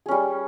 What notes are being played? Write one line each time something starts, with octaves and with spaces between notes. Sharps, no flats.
G3 C#4 G#4